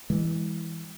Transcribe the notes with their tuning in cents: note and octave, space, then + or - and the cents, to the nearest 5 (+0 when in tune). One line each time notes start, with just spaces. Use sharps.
E3 -10 G#3 -35